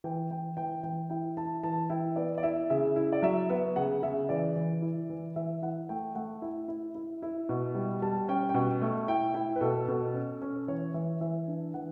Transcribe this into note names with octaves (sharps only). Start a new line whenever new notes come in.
E3 G5
E3 G5
E3 G5
E3 G5
E4 G5
E4 A5
E3 A5
E4 G5
B3 D5
D5
E4 E5
C#3 E5
E4
D5
F#3 E5
B3 E5
C#3 F#5
C#3 E5
E3 D5
E3
E4
E3
E3 E5
E4 F#5
A3 G5
A3 F#5
E4
E4
E4
E4
B2
G3
G3 A5
C#4 G5
G5
B2 F#5
A3
E4 G5
E4 G5
B4
B2 A4
B2 A4
C#4
C#4
E3 C#5
E3 E5
E3 E5
D4
E3 F#5